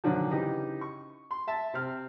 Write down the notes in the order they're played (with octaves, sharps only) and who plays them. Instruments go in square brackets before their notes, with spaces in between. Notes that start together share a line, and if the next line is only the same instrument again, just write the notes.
[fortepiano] G2 A#2 D3 D#3 F3 F#3
C#3 E3 D#4 G4
C#6
C6
E5 A5
C3 C4 F6